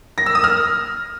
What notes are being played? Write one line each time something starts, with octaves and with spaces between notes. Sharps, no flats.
A#6
E6
D#6
F6